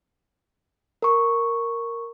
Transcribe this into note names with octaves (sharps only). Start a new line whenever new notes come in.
A#4 C#6